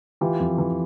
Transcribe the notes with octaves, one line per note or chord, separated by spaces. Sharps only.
E3 F4 G4
F2
E3